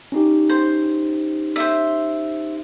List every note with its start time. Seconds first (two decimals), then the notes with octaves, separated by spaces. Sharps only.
0.12 C#4 D#4 G4
0.50 C5
1.56 C5 E5